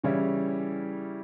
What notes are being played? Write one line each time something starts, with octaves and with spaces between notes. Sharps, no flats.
C#3 E3 G3 C#4 E4